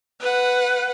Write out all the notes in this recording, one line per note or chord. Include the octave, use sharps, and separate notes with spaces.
B4 F#5